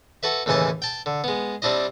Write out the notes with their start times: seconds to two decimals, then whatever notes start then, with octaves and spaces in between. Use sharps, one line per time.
0.23 F#4 A4 B4 E5
0.46 D#2 A2 C#3 E3 G#5 A5
0.82 G5 A5
1.06 D3
1.24 G#3 B3
1.62 G3 C4 D4 E4 D#5